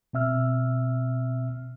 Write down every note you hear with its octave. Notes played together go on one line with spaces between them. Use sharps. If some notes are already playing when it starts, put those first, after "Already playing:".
B2 C4 E5 E6 F6